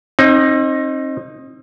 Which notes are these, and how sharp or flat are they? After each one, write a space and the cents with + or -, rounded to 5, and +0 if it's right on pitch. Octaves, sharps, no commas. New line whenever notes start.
C4 +35 D#4 +0